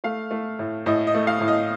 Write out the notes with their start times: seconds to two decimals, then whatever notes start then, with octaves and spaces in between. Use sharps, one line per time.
0.04 A3 F5
0.31 A3
0.59 A2
0.86 A2 D#5
1.07 D#5
1.14 A3
1.27 F5
1.41 A2
1.48 D#5